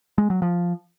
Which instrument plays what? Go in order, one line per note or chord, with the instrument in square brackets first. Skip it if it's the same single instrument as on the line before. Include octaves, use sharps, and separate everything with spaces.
[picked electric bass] G#3
F#3
F3